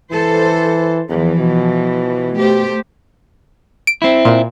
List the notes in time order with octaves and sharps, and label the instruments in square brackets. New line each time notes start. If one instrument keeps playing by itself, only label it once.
[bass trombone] E3 [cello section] A4 C5
[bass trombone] E2 [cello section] E3 F3
[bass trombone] B2
[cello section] A3 G4 C5
[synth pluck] D7
[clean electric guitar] C4 E4
[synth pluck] A#2